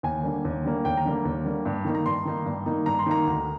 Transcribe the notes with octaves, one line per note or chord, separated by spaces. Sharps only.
D#2 G#5
D3 G3 A#3
D#2
D3 G3 A#3
D#2 G5
A#5
D3 G3 A#3
D#2
D3 G3 A#3
G2
D#3 A#3 D#4
A#5
G2 C6
D#3 A#3 D#4
G2
D#3 A#3 D#4
G2 A#5
C6
D#3 A#3 D#4 A#5
D2